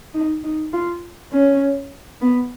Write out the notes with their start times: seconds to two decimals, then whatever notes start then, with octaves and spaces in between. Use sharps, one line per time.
0.14 D#4
0.44 D#4
0.73 F4
1.32 C#4
2.21 B3